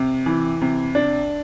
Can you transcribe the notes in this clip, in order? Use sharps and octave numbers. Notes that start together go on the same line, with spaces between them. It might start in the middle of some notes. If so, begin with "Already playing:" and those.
Already playing: C3
E3
C3
D4